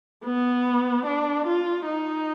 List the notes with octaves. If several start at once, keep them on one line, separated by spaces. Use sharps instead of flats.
B3
D4
F4
D#4